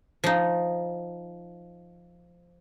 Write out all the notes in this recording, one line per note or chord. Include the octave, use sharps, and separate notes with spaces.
F3 D#4